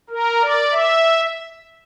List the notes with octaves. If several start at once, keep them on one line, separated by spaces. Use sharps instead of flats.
A#4
D5
E5